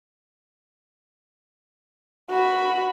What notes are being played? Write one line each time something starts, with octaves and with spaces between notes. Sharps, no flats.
F#4 B5